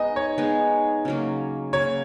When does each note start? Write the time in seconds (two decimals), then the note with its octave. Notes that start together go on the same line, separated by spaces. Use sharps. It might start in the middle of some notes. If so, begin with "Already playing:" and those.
Already playing: G#3 B3 D#4 D#5
0.16 C#5
0.38 G#3 B3 D#4
1.05 C#3 F#3 A#3
1.73 C#3 F#3 A#3 C#5